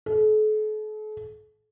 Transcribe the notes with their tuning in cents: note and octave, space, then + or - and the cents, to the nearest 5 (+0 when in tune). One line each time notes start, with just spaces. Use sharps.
A4 -45